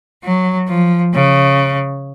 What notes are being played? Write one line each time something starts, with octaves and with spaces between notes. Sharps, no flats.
F#3
F3
C#3